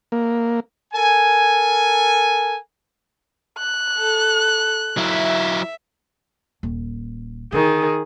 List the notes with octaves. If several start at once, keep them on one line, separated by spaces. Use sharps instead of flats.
A#3
A4 A#4 G#5
F#6
A4
F#3 E4 E5
D#1
D3 D#3 G#4